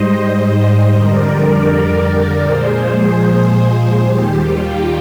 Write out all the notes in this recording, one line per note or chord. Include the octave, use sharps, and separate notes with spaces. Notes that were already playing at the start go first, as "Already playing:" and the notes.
Already playing: G#2 G3 C5 D#5
F2 D3 G3 A#4 D5
A#2 F3 G#3 G#4 C5
D#2 D#3 G3 G4
F4
G4